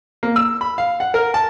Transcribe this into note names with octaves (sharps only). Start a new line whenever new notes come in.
A#3
E6
B5
F5
F#5
A#4
A5